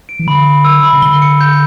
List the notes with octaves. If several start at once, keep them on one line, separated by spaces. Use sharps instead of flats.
D7
E3
D3 B5
B5
E6
B5
C#3
D3 G7
C#7
G6